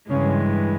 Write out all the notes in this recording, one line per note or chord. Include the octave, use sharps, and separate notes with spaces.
G2 C#3 E3 G#3 C#4